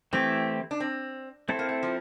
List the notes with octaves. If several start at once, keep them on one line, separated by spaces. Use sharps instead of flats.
E3 A3 C4 E4 G4
D4
C4
A3 C4 E4 A4 C5
A#3
A3
F3